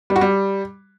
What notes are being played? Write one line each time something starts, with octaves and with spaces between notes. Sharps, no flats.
G3
F#4
G3